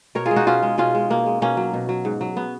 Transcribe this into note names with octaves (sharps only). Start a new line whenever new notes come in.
B2 A#4 C#5
F4 G#4
G#3
D#4 F#4
B2 C#4 F4
G#3
B2 C#4 F4
G#3
B2 A#3
G#3
B2 A#3 C#4
F#3
B2
F#3
G#2
F#3
B3